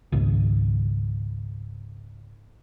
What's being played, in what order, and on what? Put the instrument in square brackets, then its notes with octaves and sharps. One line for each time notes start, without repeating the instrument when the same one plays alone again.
[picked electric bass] G#1 C#2